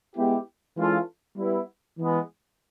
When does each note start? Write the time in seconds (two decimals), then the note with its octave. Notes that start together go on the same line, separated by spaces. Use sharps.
0.16 G#3 B3 E4 G4
0.76 E3 G#3 C#4 F4 A4
1.37 G3 B3 E4
1.98 E3 G#3 B3